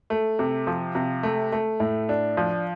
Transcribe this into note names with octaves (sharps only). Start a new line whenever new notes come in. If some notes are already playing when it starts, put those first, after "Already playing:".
A3
C3
F3
C3
A3
A3
A2
D4
F3